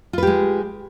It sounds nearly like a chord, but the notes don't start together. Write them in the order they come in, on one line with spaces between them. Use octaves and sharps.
F4 B4 G4 G#3